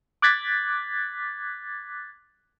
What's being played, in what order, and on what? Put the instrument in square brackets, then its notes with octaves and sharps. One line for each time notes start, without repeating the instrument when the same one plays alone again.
[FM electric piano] D6 F#6 G#6 A6 B6